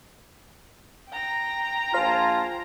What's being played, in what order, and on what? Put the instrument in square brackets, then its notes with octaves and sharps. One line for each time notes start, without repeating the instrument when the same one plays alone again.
[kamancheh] G5 A#5
[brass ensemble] A#1 G#5 A5 [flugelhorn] F4 [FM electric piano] C5 F6